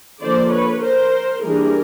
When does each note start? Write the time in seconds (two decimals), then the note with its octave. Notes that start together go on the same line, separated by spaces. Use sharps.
0.21 D3 F3 A#3 C5 D5
0.51 B4 C#5
0.82 A#4 C5
1.43 E3 G3 A#3 D4 G#4 A#4